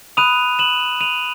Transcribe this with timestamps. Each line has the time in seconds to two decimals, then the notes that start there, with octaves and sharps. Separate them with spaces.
0.17 B5 D#6 F#6 D#7 F7
0.59 E7 F#7
1.01 D#7 F7